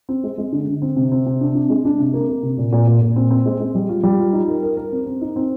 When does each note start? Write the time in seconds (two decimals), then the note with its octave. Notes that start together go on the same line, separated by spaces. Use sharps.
0.09 C4
0.24 G#3
0.38 G#3
0.52 D3
0.67 D3
0.82 C4
0.96 C3
1.12 C4
1.26 C3
1.41 D4
1.55 D4
1.70 G#3
1.85 D4
1.99 C3
2.14 A#3
2.28 A#3
2.43 C3
2.58 A#2
2.73 A#2
2.87 A#2
3.01 A#2
3.16 C4
3.31 C4
3.46 G#3
3.60 G#3
3.75 G3
3.89 F4
4.03 G3
4.19 F4
4.33 D#4
4.48 A#4
4.62 A#4
4.77 A#4
4.92 C4
5.06 C4
5.21 D#4
5.36 C4